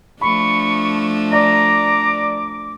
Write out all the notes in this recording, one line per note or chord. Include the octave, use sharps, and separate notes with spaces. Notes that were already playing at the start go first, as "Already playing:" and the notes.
F3 A3 D4 B5 C#6
D5 A#5 D6